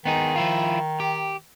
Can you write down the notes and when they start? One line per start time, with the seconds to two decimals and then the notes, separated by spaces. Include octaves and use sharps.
0.06 D#3 B3 D#4 G#4
0.36 F3 E4 F4
1.00 G4